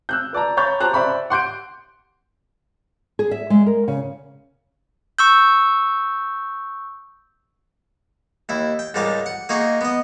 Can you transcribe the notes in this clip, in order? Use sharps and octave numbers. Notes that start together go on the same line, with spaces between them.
E6 F#6 G6
B4 D5 A5 A#5
C#5 A#5 B5 C#6 G6 A6
G4 C5 A5 A#5 F#6
C5 D5 E5 G5 B5 C#6
F#5 C6 G6 D7
G#4
E5
G#3
A#4
C#3
C#6 E6 G6
D#2 E4
G5
C#2 G#2 G3 A#4 D6
F#5
A#3 D#4 F#4 G#4 A#4
B3 D#5